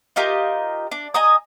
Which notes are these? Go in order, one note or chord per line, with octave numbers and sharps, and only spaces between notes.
D#4 F4 G4 A#4
D4
D#5 G#5 A#5 D#6